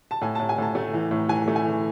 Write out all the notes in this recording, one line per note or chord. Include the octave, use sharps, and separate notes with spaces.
A5
A2 G#5
A2 A5
G#5
A2 A5
A3
E3
A2
E3 G#5
A3
G#5
E3